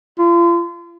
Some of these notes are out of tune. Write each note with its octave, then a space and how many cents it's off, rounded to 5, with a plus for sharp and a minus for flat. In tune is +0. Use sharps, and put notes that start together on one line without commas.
F4 -35